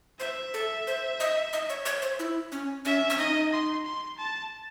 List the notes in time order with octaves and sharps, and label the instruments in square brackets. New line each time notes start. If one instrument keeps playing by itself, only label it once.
[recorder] C5 [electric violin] E5
[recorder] A4
C5
D#5
D#5
C#5
C#5
C5
E4
C#4
[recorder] C#4 [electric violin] E5
[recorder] C#4
[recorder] D#4 [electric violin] D#5
[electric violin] C6
C6
A5